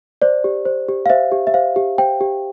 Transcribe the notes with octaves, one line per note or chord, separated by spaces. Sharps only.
C5 D5
G4
C5
G4
F5
C5 E5
G4
E5
C5 F5
G4
C5 G5
G4